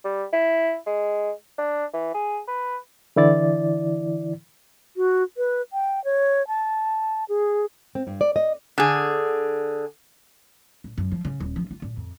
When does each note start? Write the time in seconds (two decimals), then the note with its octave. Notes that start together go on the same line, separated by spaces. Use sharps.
0.05 G3
0.33 E4
0.87 G#3
1.58 D4
1.93 E3
2.14 G#4
2.48 B4
3.16 D3 E3 E4 D5 A6
4.97 F#4
5.37 B4
5.73 G5
6.04 C#5
6.48 A5
7.29 G#4
7.95 C4
8.07 G2
8.21 D5
8.36 D#5
8.78 D3 G#4
10.84 A#2
10.98 F#2
11.12 F3
11.25 C#3
11.40 D#1
11.56 F3
11.71 F4
11.82 A#2
11.97 F2